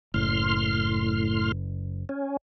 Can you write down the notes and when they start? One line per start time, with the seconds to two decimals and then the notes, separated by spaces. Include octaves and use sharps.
0.14 F#1 A2 C6 F6
2.09 C#4